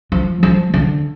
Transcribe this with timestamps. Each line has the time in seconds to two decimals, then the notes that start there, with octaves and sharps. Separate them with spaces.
0.12 F3
0.43 F3
0.74 D3